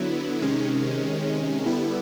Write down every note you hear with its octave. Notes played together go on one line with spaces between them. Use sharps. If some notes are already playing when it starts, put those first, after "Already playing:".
Already playing: D3 F#3 B3 E4
C3 D#3 G#3 C#4
D3 G3 B3 E4